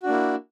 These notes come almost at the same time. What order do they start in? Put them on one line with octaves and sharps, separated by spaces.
F#4 D4 A#3 E4